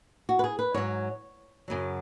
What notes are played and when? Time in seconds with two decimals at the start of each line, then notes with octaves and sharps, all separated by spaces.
0.29 F#4
0.39 B4
0.44 G#4
0.59 B4
0.74 G#2 F#3 C#5
1.68 F#2 C#3 F#3